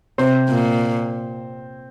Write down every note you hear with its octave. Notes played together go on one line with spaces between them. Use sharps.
C3 C4 C5
A#2